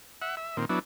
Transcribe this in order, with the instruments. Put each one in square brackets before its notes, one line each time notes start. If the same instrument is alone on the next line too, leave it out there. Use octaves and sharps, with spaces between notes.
[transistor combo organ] E5 F#5
E5
A#2 D#3 C4
F#3 B3 D4 E4